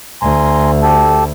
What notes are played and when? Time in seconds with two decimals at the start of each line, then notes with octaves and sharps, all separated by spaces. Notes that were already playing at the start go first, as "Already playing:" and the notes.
0.22 D2 G#5 A#5 C6
0.83 G4 A4 A5